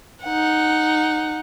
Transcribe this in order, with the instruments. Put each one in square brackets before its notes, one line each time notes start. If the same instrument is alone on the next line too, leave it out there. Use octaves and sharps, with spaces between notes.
[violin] D#4 F#5